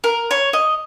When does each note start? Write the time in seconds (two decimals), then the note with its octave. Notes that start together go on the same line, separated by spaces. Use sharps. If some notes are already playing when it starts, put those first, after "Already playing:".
0.04 A#4
0.31 C#5
0.53 D#5